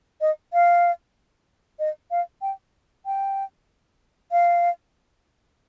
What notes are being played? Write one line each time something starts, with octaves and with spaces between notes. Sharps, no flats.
D#5
F5
D#5
F5
G5
G5
F5